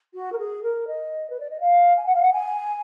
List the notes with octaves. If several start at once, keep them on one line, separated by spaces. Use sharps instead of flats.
F#4
A#4
G#4
A#4
D#5
B4
D5
D#5
F5
G#5
F#5
F5
F#5
G#5